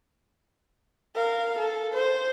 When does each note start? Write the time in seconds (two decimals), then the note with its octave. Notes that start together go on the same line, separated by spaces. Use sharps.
1.15 A#4 F5
1.59 A4
1.94 C5